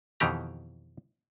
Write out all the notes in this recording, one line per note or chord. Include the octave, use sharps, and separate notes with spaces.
F2 B2 D#3 E3 G4 A#5